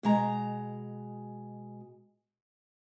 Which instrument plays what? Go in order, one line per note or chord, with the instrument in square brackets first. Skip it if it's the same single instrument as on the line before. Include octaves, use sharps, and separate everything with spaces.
[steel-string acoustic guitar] B2 G#3 A#5